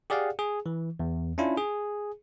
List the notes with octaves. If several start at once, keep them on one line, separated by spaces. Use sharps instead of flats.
G4 G#4 D5 F5 F#5
G#4
E3
E2
C#4 D4 E4 F4
G#4